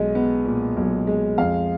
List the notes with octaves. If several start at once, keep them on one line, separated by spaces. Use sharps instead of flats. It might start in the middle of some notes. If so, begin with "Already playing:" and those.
Already playing: B1 G#3 D#5
B3
A#2
B1
G#3
F2 F5